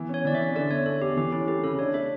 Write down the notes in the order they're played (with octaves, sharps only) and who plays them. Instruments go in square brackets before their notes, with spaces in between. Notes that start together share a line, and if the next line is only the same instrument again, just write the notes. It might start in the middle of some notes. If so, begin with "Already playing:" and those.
Already playing: [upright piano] E3 B3
[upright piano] C#4 [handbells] C#5
[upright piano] E3 [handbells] D5
[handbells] E5
[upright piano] C#4
[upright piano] D3 [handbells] D5
[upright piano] E2 [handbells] C#5
[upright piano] E2 [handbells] A4
[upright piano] E2 [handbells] G4
[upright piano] E3 [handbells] G4
[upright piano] C#4 [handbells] E4
[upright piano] A3 [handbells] G4
[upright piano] C#3 [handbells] A4
[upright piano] D4 [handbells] C#5
[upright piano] A3 [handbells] E5